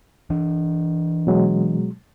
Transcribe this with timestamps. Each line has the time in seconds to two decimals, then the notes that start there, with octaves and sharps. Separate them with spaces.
0.30 E3 D4
1.27 B2 F#3 G#3